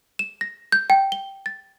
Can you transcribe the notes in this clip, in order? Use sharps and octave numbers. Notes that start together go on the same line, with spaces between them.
E7
A#6
G6
G5
G7
A6